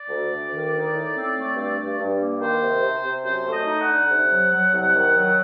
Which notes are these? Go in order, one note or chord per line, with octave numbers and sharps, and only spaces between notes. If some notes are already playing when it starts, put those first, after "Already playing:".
Already playing: D5
D2
D2
D#3
D#4
A2
C4
A3
G2
G2
G2
A#3
D#3 C5
C3
C3
C3
F#2 C5
A3
D#5
D#4
F#5
D3
C3
F#3
F#3
C2
D#3
F#3